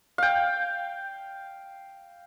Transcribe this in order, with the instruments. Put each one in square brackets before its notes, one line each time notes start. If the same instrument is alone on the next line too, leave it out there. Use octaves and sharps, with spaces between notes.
[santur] F5 G5